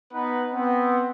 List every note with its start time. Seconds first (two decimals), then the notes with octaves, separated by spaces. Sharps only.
0.12 B3 D#4 B4
0.52 B3 C4